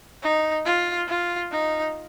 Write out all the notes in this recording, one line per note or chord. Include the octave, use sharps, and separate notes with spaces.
D#4
F4
F4
D#4